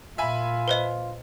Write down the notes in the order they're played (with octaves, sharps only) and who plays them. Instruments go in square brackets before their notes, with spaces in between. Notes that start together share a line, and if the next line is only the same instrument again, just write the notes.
[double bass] A#2 [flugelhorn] F4 [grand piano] E5 G#5 B5
[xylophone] B4 C5 D#5